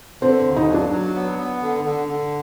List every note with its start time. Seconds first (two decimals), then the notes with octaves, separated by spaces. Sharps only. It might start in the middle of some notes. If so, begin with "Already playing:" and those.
0.22 D3 C4
0.46 D#2
0.56 D#4
0.69 F#3
0.74 D4
0.91 F#3
1.15 B3
1.38 B3
1.62 D3
1.84 D3
2.08 D3